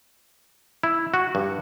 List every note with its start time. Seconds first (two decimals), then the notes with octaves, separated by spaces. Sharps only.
0.83 E4
1.14 F#4
1.35 G2